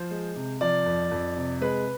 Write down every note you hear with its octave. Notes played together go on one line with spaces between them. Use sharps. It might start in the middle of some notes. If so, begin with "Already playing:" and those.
Already playing: F3 C5
G#3
C3
F3 D5
F2
F2
C3
G#3 B4